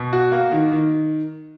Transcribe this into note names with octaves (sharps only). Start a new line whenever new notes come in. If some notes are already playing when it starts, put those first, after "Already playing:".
Already playing: B2
F#4
A#3
D#3
D#3